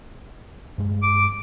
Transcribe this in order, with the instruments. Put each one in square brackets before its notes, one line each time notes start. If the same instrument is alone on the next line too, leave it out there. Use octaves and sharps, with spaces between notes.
[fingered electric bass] G2 G#3
[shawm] D6